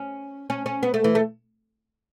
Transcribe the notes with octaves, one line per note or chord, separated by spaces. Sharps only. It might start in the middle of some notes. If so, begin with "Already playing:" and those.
Already playing: C#4
C#4
C#4
B3
A3
E3
A3